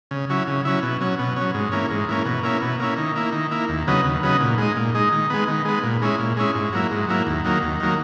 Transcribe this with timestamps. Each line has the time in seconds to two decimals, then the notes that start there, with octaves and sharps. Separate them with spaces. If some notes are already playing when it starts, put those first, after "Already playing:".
0.11 C#3
0.30 F#3 C#4 E4
0.47 C#3
0.65 F#3 C#4 E4
0.83 B2
1.01 F#3 C#4
1.19 B2
1.36 F#3 C#4
1.54 G#2
1.72 E3 A#3 C#4
1.91 G#2
2.09 E3 A#3 C#4
2.26 B2
2.43 A#3 C#4 E4
2.62 B2
2.80 A#3 C#4 E4
2.97 D#3
3.16 A#3 E4
3.33 D#3
3.51 A#3 E4
3.69 D#2
3.87 C#3 F#3 B3 D#4
4.04 D#2
4.23 C#3 F#3 B3 D#4
4.41 A#2
4.58 G#3 D#4
4.76 A#2
4.95 G#3 D#4
5.12 D#3
5.30 G#3 B3
5.48 D#3
5.65 G#3 B3
5.83 A#2
6.02 G#3 C#4 E4
6.19 A#2
6.37 G#3 C#4 E4
6.55 G#2
6.73 F#3 A#3 E4
6.91 G#2
7.08 F#3 A#3 E4
7.27 D#2
7.44 D#3 F#3 A#3
7.63 D#2
7.80 D#3 F#3 A#3